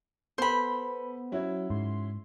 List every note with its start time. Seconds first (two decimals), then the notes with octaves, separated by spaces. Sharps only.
0.38 B3 A4 B4 C5 B5
1.32 F#3 C#4 E4 F#4
1.70 G#2 C6